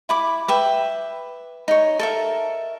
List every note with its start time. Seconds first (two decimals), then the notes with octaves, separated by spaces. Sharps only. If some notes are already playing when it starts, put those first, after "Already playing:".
0.09 E4 B5 D6
0.48 B4 E5 G5
1.68 D#4 C#5
1.99 A4 A#4 E5